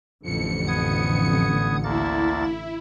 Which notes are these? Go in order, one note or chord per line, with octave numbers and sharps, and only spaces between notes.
A1 F2 D3 C#7
B3 D#6 G#6
D2 A#3 E4 A6